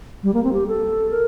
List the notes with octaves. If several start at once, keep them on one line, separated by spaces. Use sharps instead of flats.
G3
A#3
C4
G4
A4
A#4